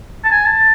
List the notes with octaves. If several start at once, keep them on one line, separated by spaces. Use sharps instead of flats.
A5
G#5
A5